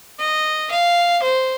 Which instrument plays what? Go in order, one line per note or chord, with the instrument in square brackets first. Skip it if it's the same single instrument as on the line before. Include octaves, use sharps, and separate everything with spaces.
[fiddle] D#5
F5
C5